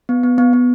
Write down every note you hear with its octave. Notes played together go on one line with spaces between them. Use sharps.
B3
B3
B3
B3